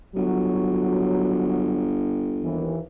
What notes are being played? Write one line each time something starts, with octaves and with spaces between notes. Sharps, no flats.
G1 F#3
D#2 E3